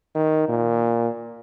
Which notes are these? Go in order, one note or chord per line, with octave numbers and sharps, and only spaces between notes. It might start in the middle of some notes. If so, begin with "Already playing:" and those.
D#3
A#2